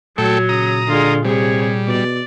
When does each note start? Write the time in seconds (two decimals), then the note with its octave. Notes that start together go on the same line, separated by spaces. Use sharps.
0.18 A#2 F#3 A3 A4 G5
0.49 C#3 A#5 D#6
0.88 D3 G#3 F4
1.25 C3 G3 G#4 C#5
1.88 B2 D5